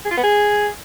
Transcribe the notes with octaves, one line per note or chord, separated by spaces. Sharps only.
G#4
F4
B3
G#4